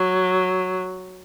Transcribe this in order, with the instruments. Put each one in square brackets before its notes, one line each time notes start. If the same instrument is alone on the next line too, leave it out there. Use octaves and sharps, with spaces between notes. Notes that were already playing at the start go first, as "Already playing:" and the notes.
Already playing: [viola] F#3